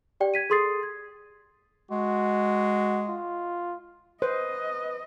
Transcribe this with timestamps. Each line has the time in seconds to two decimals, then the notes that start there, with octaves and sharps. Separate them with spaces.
0.20 G4 D5 G5
0.34 G#6 B6 D#7
0.50 G#4 A4 C6 D#6 A6 C7
0.83 G#6
1.91 G#3 F#4
3.09 F4
4.22 B4 C5 D#5